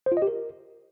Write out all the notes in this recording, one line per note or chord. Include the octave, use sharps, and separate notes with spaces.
C5
F4
D#5
G4
A#4